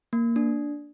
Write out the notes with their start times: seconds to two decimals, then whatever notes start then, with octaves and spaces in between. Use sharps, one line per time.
0.13 A#3
0.36 D4